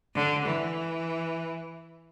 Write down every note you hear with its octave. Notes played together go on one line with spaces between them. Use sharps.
D3
E3